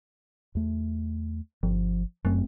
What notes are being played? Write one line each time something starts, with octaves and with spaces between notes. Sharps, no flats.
E2 A3
G1 F3
F#1 F#2 A3 C4